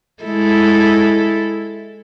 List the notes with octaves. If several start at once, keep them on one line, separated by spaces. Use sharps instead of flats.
G#3 E4 A4